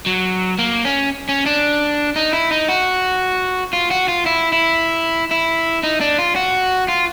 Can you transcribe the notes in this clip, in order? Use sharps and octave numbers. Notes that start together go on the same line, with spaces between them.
F#3
A#3
C#4
C#4
D4
D#4
E4
D#4
F#4
F4
F#4
F4
E4
E4
E4
D#4
D4
F4
F#4
F4